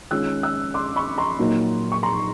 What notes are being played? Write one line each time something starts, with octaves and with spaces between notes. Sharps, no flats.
D#3 G#3 C#4 F4 E6 F#6
E6 F#6
C6 D6
B5 C#6
A#5 C6
A#2 F#3 A#3 D#4
C#6
A#5 C6